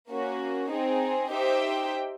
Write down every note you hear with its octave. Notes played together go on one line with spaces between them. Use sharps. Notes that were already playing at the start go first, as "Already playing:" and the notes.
A#3 C#4 F#4
C4 D#4 G#4
D#4 G4 C5 E5 G5